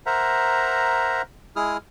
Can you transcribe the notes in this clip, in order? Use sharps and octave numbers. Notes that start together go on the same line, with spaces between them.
A#4 C5 E5 F#5 A#5
G#3 E4 G#4 D#6 F6